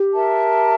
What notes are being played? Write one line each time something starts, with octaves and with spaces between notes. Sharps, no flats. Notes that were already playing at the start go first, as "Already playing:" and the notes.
Already playing: G4
A#4 E5 A5